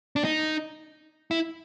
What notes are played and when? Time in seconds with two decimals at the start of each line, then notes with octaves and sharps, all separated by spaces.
0.16 D4
0.24 D#4
1.31 E4